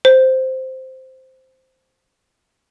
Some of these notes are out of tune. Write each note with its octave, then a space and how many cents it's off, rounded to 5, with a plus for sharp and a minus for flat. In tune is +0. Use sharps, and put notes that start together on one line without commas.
C5 -5